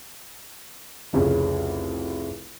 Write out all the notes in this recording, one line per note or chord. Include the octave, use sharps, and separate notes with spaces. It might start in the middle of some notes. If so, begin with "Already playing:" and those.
F1 C2 F2 C#3